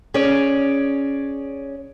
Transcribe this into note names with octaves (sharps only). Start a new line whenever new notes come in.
C#4 G#4 C#5 D5